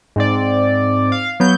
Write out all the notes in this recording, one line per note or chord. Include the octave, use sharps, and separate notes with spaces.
G#2 C4 D5
F5
F#3 B3 G6